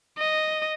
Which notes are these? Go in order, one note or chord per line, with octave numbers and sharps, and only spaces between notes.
D#5